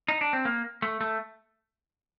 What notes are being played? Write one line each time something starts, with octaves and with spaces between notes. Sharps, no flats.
D#4
D4
C4
A#3
A3
A3